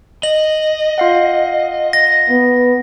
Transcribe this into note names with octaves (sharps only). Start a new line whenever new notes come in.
D#5 F#7
F4 F5 F#5
A#6
B3